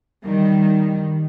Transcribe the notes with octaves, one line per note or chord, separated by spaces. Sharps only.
D#3 G3